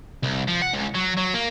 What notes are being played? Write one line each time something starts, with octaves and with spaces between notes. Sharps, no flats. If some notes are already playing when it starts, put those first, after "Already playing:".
C2
F3
F#5
C#2
F#3
F#3
A#3